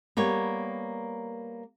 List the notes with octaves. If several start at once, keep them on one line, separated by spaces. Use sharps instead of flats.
G3 A#3 B3 C#5